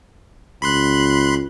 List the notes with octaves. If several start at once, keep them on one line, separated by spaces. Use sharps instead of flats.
C#2 B5 C6 F#6